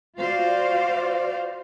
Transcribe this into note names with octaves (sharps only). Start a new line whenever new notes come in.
F4 F#4 C5 D5 F5